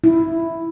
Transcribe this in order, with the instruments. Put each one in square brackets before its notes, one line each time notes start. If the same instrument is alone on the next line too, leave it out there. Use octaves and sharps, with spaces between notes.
[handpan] E4